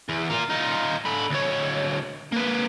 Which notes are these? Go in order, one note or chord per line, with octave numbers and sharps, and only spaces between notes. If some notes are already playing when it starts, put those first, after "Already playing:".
E2
F4 A#4
D#4 F4
D3 B5
D2 C#5
A#3 B4